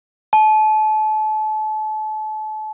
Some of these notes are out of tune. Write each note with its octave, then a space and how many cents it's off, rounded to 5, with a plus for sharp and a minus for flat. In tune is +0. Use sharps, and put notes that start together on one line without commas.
A5 -35